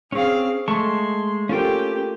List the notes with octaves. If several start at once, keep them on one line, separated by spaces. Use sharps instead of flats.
C4 C#4 G#4 F5
G#3 A3 A5 C6 C#6
A#3 C#4 F4 G4 A4 C5 G5